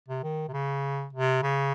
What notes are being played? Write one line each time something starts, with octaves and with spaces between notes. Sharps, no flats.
C3
D#3
C3
C#3
C3
C#3